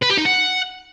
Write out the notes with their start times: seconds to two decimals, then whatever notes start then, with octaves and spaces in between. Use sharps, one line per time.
0.02 B4
0.10 G4
0.17 D#4
0.25 F#5